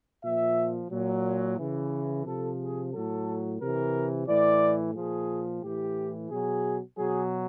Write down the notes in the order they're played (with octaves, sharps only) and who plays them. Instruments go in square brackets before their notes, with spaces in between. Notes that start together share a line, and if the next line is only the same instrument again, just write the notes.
[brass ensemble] A#2 F3 E5
A#2 F#3
C#3 E3
C3 F3 A4
G#4
A2 F#3 A4
C3 E3 A#4
A2 E3 D5
A#2 F3 G#4
A2 E3 G4
B2 F#3 G#4
B2 F#3 G#4